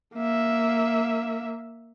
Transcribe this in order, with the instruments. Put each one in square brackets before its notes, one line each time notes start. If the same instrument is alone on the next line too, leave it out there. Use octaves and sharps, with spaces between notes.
[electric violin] A#3 E5